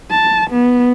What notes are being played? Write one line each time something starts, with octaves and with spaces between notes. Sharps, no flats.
A5
B3